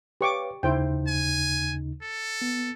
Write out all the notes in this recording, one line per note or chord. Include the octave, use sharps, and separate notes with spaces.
G4 B4 C#5 F5 C#6 D6
D#2 C#3 D#4 E4 C5 G5
G#5
A4
B3